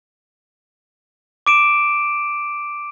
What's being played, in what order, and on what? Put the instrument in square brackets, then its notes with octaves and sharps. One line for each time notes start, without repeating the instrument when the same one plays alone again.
[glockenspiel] D6 D7 E7